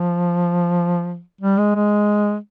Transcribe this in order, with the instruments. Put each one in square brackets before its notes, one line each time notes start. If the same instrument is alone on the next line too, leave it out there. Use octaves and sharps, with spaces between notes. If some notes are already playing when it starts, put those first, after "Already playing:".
Already playing: [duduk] F3
G3
G#3
G#3